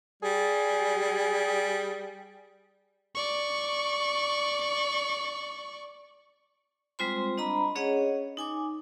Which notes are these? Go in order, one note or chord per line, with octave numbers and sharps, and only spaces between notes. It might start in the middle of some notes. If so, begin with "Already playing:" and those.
G3 G#4
D5 C#6
G3 G#3 C4 F4 C5 C6
D4 D#5 A#5 B5
C#4 G#4 C#5 D#5 F#5
D#4 G#5 D6